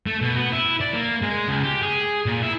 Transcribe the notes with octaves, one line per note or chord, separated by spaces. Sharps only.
A3
B2
B3
E4
D5
A#3
G#3
C#2
G4
G#4
A#2
E4